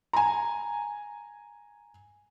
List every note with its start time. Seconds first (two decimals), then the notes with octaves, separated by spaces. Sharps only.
0.13 G#5 A#5